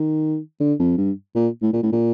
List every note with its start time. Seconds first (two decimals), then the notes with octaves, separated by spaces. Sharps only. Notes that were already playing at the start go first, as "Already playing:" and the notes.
Already playing: D#3
0.60 D3
0.79 F2
0.97 G2
1.35 A#2
1.62 A2
1.73 A#2
1.83 A2
1.92 A#2